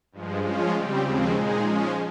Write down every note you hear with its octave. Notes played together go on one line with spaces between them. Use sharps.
G2 F3 G#3
F3 G#3 C#4 F4
C#3 G3 C4 G4
D#2 C#3 F3 G#3 C4
A#2 G#3 D#4 G#4
F3 G#3 C#4